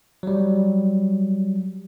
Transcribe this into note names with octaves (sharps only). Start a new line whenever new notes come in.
F#3 G3